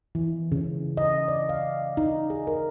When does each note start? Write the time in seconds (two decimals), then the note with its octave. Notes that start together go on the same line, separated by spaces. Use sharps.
0.15 E3
0.52 C#3
0.97 D#5
1.28 D5
1.49 F5
1.97 D#4
2.30 G#4
2.47 A#4